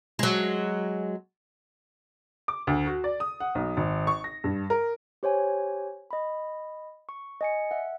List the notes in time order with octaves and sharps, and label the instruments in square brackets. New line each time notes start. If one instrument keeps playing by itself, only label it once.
[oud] F#3 G#3
[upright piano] D6
D2
F#4
D5
D#6
F#5
B1
G#1
C#6
A#6
G2
A#4
[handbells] G4 C5 C#5 G#5
D#5 B5
C#6
D#5 G#5 C#7
E5 F#5